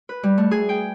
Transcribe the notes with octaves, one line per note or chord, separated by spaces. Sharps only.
B4
G3
A3
G#4
G5